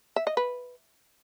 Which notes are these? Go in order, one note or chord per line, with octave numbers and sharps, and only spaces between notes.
E5
D#5
B4